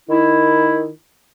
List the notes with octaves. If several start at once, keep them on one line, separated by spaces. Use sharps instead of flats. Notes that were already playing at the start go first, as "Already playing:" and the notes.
D#3 E4